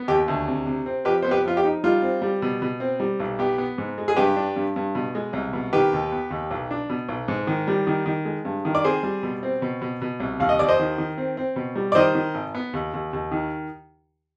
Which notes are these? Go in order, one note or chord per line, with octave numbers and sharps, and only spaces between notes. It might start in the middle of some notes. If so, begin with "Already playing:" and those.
Already playing: B3
D#2 G4
D2
C3
C3
C4
F3 G4 B4
B3 C5
G4 B4
F3 F4
G4
D#4
G3 F4
C4
G3
B2
B2
C4
G3
B1
B3 G4
B3
G#2
G#3
G#4
G2 G4 B4
D4
G2
G2
B2
G#3
C2
B2
D#3 G4 B4
D#2
B3
D#2
B1
D4
B2
B1
G#2
D#3
G3
D#3
D#3
G#3
G2
D#3
D5
C4 G#4 C5
G3
B2
C4
B2
B2
B2
C2
D#2 F5
D#5
D#2 D5
C5 D#5
D#3
D#3
C4
C4
B2
G3
D5
D#3 C5 D#5
D#3
G#1
B3
D#2
D#2
D#2
D#3